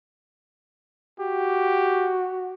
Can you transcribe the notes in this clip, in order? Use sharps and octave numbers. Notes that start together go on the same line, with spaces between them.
F#4 G4